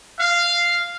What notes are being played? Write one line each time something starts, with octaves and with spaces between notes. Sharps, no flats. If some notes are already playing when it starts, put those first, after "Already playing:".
F5